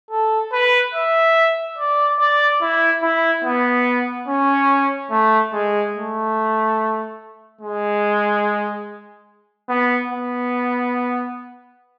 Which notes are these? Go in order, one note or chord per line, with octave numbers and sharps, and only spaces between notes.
A4
B4
E5
D5
D5
E4
E4
B3
C#4
A3
G#3
A3
G#3
B3
B3